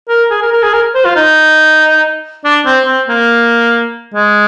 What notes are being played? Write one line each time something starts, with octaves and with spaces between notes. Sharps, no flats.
A#4
G#4
A#4
A#4
G#4
A#4
C5
F4
D#4
D4
C4
C4
A#3
G#3